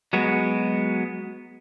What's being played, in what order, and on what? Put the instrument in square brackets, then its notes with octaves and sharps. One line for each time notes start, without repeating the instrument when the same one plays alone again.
[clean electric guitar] F#3 G#3 B3 F#4